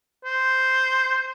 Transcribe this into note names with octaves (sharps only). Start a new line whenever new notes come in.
C5